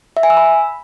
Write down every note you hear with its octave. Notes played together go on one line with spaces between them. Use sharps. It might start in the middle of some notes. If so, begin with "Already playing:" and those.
E5
G#5
E6
B5